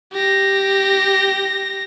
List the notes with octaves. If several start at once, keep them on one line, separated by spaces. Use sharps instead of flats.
G4 A#6